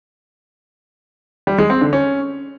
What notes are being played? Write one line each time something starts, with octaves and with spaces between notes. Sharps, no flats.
G3
G#3
C4
D3
C#4